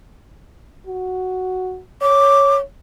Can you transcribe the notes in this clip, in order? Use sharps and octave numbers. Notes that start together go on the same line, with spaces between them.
F#4
C#5 D6